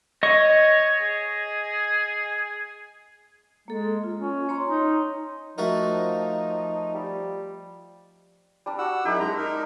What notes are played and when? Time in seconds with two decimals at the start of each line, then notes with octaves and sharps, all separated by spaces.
0.23 C#5 D#5 C#6
1.02 G#4
3.68 G#3 A#3 A4
4.04 F4
4.16 C#4
4.49 C#5 A#5 C6
4.67 D#4
5.58 F3 A3 D#4 F#4 A#4
6.95 G3
8.66 G3 D4
8.79 F#4 F#5 E6
9.05 F#2 D#4 E4 G4
9.20 G#3 A#5
9.37 D#4 A#4